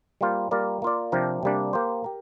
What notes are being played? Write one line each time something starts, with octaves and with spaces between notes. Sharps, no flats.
G3 A#3 F4 C5
G3 A#3 F4 A#4 D5
A#3 F4 D5
C3 F3 D4 G4 A#4
C3 G3 A#3 D4
A#3 G4 C5
G4 A#4